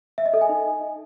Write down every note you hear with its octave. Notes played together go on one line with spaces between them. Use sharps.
E5
D#5
A4
G#5
D#4